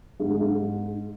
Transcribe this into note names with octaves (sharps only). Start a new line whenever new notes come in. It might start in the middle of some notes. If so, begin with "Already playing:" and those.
G#2
G#3
G#2